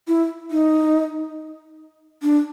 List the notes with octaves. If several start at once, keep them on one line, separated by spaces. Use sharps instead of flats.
E4
D#4
D4